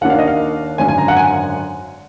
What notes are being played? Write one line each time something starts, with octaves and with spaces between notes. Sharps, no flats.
D#2 D#3 A#3 D4 F#5
F5
D#5
F5
G#1 F#2 D3 G#5
G#5
A#5
F#5
G#5